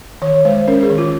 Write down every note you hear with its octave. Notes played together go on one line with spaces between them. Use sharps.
D#3 C#5
G#3 C5
C#4 A#4
G#4
D#3
F4